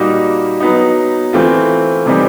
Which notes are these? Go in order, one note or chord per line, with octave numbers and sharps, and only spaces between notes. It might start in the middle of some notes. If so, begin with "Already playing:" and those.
Already playing: A#2 G3 A#3 D#4 F#4
F#3 B3 D#4
E3 A3 C4 F4
C3 E3 G3 C4 D#4